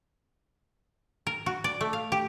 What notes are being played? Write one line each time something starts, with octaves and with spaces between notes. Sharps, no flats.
A#4
F#4
D5
A3
F5
G4